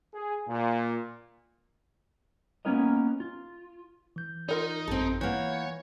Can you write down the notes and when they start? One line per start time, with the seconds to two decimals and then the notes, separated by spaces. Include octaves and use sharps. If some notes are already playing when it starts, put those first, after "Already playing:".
0.14 G#4
0.48 A#2
2.65 A#3 B3 C#4 F4 A#4 D#5
3.20 F4
4.16 E3 G6
4.49 D#4 F4 A#4 D5
4.87 A1 F#2 C4 A4
5.21 E3 A#3 C#5 F#5 G6